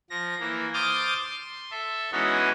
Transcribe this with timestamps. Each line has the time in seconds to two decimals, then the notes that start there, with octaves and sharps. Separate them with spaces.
0.10 F3 A#6
0.40 E3 A#3
0.74 C5 D6 D#6 F6 G6 A6
1.24 C6
1.71 A4 E5
2.12 E3 G#3 B3 C#4 D#4 F#4